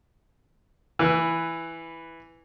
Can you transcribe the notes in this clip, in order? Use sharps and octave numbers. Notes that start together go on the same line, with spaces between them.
E3 B4